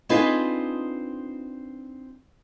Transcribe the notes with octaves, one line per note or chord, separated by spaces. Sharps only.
C4 D4 D#4 F4 G#4 B4